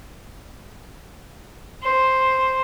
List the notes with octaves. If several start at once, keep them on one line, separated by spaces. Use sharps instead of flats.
C5